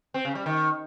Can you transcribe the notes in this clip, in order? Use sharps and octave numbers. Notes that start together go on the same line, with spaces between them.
C4
C#3
G3
D#3